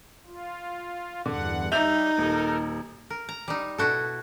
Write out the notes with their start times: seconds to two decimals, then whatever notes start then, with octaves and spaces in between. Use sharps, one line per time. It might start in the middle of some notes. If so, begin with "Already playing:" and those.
0.26 F4
1.26 E2 G2 D3 F#5
1.72 G3 D#4 E5 G6 F7
2.18 D#1 A4 A#4
3.10 A#4
3.29 A#5
3.48 G3 D#4
3.78 B2 E4 F#4 A4